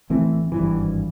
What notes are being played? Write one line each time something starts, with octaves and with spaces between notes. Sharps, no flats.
A1 E3 A3 C4
G#1 G2 E3